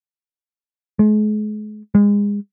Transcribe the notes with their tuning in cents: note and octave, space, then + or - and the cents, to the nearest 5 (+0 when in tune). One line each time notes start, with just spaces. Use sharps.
G#3 +40
G#3 -30